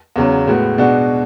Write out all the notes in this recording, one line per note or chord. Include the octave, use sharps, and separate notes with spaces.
E2 C#3 F#3
A2 G#3 B3 F#4
B2 G#3 D4 F#4